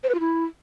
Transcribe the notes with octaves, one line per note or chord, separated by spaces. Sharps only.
C5
B4
F4
E4